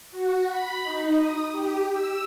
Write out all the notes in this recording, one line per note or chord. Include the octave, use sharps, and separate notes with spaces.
F#4
B5
D#4
D#6
G4
E6